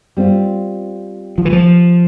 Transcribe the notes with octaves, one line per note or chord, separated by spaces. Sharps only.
G3 C4 F4
F3
E3
F3